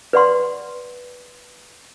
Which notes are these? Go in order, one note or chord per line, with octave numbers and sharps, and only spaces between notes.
B4 D5 F#5 C6